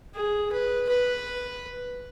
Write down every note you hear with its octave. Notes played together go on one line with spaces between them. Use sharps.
G#4
B4
B4